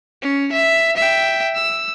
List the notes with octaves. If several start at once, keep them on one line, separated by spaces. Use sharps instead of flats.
C#4
E5
E5 G5
E6